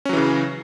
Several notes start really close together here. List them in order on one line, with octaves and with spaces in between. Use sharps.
C#4 F#3 E3 C#3